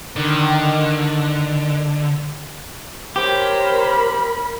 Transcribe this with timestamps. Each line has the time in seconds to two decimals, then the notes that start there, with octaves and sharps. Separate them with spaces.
0.16 D3 D#3
3.16 G4 A#4 C5 C#5 B5